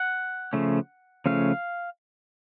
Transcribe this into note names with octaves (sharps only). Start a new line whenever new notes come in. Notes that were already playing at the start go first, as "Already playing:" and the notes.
Already playing: F#5
C#3 F3 A3 C#4
C#3 F3 A3 C#4 F5